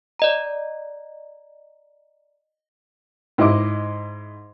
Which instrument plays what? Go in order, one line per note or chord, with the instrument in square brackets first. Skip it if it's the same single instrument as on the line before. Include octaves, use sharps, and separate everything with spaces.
[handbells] D5 D#5 A#5
[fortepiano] G#2 E4 D#5 D6